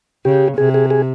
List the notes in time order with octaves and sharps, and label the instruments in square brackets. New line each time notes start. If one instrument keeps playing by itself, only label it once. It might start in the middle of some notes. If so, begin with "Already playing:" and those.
[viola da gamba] C#3 [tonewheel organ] G4
[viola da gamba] C3 [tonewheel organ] G#4
[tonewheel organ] G#4
G#4